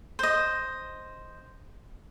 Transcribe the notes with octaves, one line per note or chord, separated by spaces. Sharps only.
C5 D#5